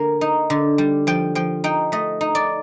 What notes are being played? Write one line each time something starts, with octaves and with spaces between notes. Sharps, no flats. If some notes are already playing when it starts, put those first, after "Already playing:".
Already playing: D3 A#3
D#4
D3
G3
F3 G5
F3 G5
D#4 G5
A3 D#5
D#4
D5